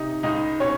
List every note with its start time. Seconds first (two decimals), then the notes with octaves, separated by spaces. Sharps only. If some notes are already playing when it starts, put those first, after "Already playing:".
Already playing: C3 D#4
0.23 C#2 D#4 D#5
0.60 B2 C#4 C#5